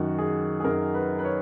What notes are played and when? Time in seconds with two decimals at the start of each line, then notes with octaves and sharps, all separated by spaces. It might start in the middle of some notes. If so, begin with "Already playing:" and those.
Already playing: F#2 D#3 F#4
0.19 G#4
0.60 G#4
0.64 F#2 D#3 A#4
0.94 B4
1.19 B4
1.25 C#5